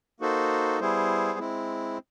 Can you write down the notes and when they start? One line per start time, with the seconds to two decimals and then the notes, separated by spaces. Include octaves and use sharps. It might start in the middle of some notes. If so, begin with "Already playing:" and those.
0.20 A#3 D#4 F#4 A4 C5
0.80 G3 B3 E4 G#4 C5
1.38 G#3 C4 E4